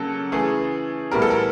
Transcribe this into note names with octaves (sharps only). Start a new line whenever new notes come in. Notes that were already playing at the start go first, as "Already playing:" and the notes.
Already playing: C#3 F#3 A#3 A4
C#3 E3 A3 G#4
A2 E3 G3 B3 A#4
A4
A#4